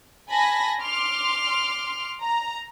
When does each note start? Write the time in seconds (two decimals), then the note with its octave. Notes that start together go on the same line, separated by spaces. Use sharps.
0.29 G#5 A5 B5 A#6 B6
0.81 C6 D6 F6
2.21 A#5